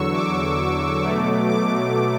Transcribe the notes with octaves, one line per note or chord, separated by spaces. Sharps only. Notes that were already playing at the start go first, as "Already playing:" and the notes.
Already playing: E2 D3 F#3 C#6 E6
D6
B2 F#3 A3
D6